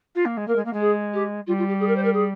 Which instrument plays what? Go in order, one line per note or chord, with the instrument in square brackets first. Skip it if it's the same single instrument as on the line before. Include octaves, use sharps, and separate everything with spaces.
[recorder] F4
A#3
G#3
[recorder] A#3 [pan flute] A#4
[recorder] G#3
A#3
G#3
[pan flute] G#4
G4
[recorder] G3 [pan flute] F4
[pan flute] F4
G4
G#4
A#4
C5
A#4
G#4